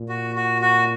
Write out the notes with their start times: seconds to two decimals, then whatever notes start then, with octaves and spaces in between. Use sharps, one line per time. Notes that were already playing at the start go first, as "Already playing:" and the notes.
Already playing: A#2
0.09 F#4
0.36 F#4
0.62 F#4